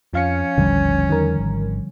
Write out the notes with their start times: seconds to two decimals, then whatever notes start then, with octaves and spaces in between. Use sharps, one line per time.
0.13 F2 F3 C#4 F5 C#7
0.58 D#1 A1 D3 F3 G3
1.10 E2 D#3 A#4
1.39 G#1